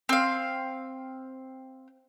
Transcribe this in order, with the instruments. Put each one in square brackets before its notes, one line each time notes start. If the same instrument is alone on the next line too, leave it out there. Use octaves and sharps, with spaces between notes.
[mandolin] C4 F5